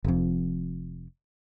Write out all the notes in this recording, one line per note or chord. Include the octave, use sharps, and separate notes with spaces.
F1 F2